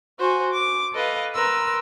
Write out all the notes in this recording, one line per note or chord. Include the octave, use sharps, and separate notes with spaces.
F#4 C5 G#5
D6
A4 B4 D#5 F5
A#4 B4 C6 E6